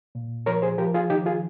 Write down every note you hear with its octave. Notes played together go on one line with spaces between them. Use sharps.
A#2
F3 A#4 C#5
G#4 C5
F3 G4 A#4
F4 G#4
D#3 D#4 G4
F4 G#4